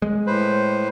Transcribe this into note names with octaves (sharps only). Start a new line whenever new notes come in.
G#3
A2 B4 C5